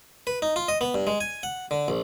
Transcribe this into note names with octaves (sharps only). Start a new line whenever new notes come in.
B4
D#4
F4
D#5
B3
G2
G#3
G#5
F#5
D3
A#1